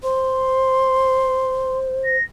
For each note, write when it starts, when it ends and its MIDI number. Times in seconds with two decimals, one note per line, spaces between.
0.03 2.16 72
0.03 1.77 84
2.04 2.22 94